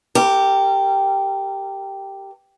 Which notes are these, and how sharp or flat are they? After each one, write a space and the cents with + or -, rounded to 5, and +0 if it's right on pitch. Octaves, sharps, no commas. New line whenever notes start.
G4 +0 A#4 -35